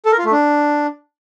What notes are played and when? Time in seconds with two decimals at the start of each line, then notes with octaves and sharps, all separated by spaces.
0.05 A4
0.12 A#4
0.18 F4
0.25 A3
0.32 D4